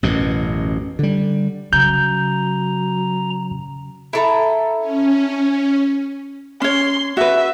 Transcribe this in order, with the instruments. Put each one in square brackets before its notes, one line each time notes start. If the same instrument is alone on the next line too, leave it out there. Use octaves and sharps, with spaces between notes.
[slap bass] A1 F#2 B2
D3 G3
[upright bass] C#3 [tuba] F#3 [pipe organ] A#5 [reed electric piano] G6
[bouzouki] E4 A4 A#5
[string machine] C#4
[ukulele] C#4 C#5 [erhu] C6
[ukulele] F#4 B4 [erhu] E5